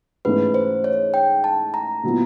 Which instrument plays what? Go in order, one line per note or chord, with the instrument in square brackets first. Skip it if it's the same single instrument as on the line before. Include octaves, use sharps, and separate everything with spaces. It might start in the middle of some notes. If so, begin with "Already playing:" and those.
[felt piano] G#2 E3 A3 C#4 [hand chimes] B4
[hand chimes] C5
C#5
G5
A5
A#5
[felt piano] A#2 F#3 B3 E4